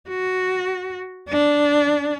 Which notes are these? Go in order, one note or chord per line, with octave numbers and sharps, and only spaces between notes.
F#4
D4